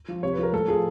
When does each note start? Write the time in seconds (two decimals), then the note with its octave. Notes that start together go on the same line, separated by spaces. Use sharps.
0.08 F3
0.23 C3 C#5
0.33 F3 B4
0.43 A#4
0.53 A2 A4
0.68 F3 G#4